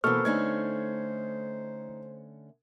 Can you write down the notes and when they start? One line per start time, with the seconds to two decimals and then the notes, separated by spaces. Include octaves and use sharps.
0.04 B2 E3 A#3 A4 C5 C#6 F6
0.25 D3 A3 C#4 D#4 G#6